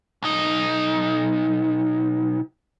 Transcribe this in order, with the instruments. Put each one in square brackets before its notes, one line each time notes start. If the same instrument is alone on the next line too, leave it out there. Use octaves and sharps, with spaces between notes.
[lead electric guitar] B1 D#4